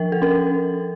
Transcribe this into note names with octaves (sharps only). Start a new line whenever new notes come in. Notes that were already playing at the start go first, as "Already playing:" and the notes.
Already playing: F3 A#4
A4
C#4 A#4